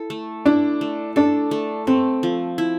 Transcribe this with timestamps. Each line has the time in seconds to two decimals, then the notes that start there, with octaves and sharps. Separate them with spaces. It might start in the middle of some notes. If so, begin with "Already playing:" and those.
Already playing: E4 A4
0.10 A3
0.46 D4 E4
0.81 A3
1.16 D4 A4
1.51 A3
1.87 A3 C4
2.23 F3
2.58 E4